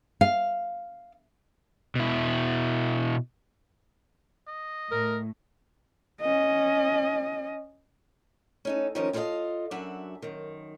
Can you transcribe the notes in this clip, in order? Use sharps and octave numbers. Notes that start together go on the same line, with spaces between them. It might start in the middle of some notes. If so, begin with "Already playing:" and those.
F5
B2 E4
D#5
A2 A#4
C#4 D#5
C#4 D#4 A4
D#3 F3 C#4 D#4 A#4
E4 F4 A4 C5 D#5 F5
F#2 D4 F#4 E5 F#5
F#2 D#3